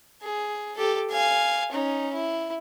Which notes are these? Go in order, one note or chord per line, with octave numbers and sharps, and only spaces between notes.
G#4
G4 A4
F5 G#5
C#4 D#4
E4